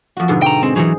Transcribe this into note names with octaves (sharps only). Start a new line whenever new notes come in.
F2 F#4
G#2 B2 D3
G5 A#5
G#3 C4
E3 F#3 G#4 C5